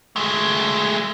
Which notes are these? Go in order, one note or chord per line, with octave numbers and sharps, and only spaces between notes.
G#3 A3